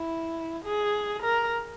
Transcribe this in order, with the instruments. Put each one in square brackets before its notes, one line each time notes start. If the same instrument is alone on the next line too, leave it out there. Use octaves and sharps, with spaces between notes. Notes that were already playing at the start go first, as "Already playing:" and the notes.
Already playing: [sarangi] E4
G#4
A#4